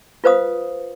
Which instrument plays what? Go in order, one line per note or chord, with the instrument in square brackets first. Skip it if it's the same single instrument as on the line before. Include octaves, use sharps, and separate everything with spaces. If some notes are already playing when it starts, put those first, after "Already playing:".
[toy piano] F4 B4 C5 F5 D#6